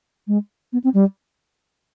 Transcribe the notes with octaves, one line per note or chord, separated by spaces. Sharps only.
G#3
B3
C4
G3